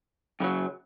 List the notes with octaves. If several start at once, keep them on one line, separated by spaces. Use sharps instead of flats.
F#2 C#3 F#3